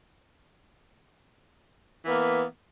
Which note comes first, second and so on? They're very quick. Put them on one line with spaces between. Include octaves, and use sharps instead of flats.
E3 B3 A#3